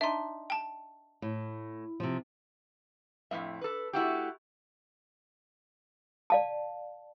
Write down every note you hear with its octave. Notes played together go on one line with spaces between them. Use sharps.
D4 D#4 E5 C6
G5 A5
A2
C3 F3
F2 A2 B3 E5
A4 B4
A3 E4 F#4 G4
D5 F5 A5